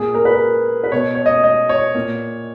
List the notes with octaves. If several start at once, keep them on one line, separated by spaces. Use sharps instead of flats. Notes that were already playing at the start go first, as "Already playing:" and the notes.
Already playing: A#2 G#4
A#4
B4
A#4
B4
B2 C#5
C#5
D#5
D#5
C#5
A#2